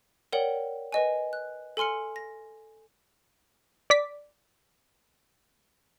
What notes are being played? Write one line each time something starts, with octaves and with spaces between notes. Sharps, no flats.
A#4 C#5 D5 F#5 G5 F#7
B4 D#5 G#5
F#6
A4 G#5 C6 F6 C#7
A#6
D5 D6 B6